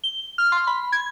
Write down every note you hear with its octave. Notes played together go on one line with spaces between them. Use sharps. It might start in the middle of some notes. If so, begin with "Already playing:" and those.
G7
F6
C6
B5
G#6